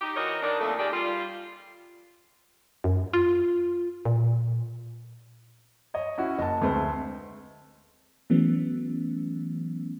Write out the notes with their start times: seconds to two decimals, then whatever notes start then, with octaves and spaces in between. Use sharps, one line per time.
0.01 D#4 G4
0.16 E3 D#4 F#4 A#4 C#5 D#5
0.42 D#3 D4
0.60 F2 A#2 D#3 A3
0.78 D#3 G#3 G4 D5
0.92 G3 F4
2.84 F#2
3.13 F4
4.05 A#2
5.94 C#5 D#5
6.18 C#4 E4 F#4
6.39 F#1 D#5 A5
6.62 D2 G#3 A3 C4 B4 C5
8.30 E3 F#3 A3 B3 C#4